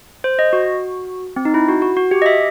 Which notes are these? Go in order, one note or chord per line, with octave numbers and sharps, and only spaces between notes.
C5
D#5
F#4
C4
D#4
E4
F#4
F#4
F#4
G4
D#5
E5